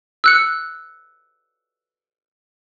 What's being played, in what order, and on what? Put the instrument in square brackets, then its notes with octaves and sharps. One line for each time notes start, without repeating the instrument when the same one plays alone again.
[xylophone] E6 F#6 C#7